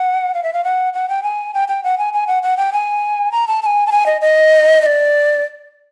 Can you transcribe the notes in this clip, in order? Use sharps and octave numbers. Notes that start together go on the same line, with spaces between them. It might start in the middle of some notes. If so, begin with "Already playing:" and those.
Already playing: F#5
F5
E5
F5
F#5
F#5
G5
G#5
G5
G5
F#5
G#5
G#5
F#5
F#5
G5
G#5
A#5
A5
A5
G#5
A5
G#5
D#5
D#5
D#5
D5